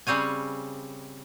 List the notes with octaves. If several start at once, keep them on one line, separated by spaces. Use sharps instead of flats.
C#3 G3 C4 C#5 G#5